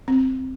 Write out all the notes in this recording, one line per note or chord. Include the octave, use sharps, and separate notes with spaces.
C4